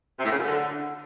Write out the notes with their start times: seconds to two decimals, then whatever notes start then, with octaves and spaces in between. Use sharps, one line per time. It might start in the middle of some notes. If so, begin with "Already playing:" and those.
0.18 C3
0.24 A2
0.30 C#3
0.36 F#2
0.42 D3